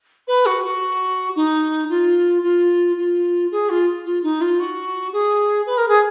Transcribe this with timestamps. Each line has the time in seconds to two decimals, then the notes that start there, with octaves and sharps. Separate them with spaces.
0.27 B4
0.46 F#4
0.64 F#4
1.35 D#4
1.89 F4
2.43 F4
2.97 F4
3.51 G#4
3.69 F4
4.05 F4
4.23 D#4
4.41 F4
4.59 F#4
5.13 G#4
5.66 B4
5.77 A#4
5.88 G#4